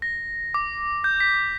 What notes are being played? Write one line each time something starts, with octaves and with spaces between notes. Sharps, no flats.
A#6
D6
G6
B6